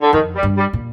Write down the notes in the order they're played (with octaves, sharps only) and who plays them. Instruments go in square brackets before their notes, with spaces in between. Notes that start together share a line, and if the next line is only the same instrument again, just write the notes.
[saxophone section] D3
[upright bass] F2 [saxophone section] D#3
[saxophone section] G3
[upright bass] G2
[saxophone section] G3
[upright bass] A#2